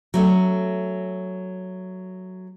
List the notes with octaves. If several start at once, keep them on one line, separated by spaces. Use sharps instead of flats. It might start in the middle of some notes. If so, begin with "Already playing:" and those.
F#3 A3 C#4